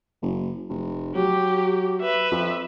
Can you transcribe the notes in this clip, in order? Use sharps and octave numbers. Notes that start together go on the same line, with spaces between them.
F#1
F1
F#3 G4
B4 E5
F2